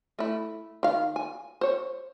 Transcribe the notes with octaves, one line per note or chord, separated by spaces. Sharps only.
A3 E4
D#3 F5
G#5
C5 C#5